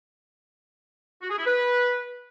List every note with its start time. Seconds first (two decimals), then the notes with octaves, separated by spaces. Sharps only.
1.22 F#4
1.30 G#4
1.38 E4
1.46 B4